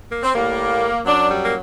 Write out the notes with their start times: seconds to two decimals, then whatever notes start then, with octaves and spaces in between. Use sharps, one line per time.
0.12 A#3
0.23 C4
0.34 A2 G3 A#3
1.05 F#2 F#3 D4
1.28 G3
1.42 A#3